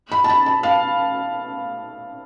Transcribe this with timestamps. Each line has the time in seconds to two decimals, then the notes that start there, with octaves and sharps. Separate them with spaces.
0.12 B5
0.24 A5
0.29 B5
0.46 A5
0.63 F5